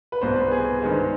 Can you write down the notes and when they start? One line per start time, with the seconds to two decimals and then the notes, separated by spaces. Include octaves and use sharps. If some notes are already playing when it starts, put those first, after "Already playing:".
0.12 B4
0.21 C2 B2 B3 C5
0.36 B4
0.52 G#4
0.81 G2 D#3 G#3 B3 C5